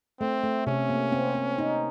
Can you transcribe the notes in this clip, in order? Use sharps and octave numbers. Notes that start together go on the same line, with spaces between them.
A3 C4
A3
C3 C#4
A#3
C4
C4
D#4